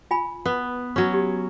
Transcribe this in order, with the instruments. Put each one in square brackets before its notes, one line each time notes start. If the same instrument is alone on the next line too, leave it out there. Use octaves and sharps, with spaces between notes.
[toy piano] F4 G#5 B5
[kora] B3 [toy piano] B4
[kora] F#3 C#4
[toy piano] G4